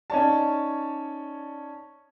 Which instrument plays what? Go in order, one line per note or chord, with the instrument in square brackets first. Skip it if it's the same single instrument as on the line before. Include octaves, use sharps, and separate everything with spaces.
[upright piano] C#4 D#4 C#5 D5 A5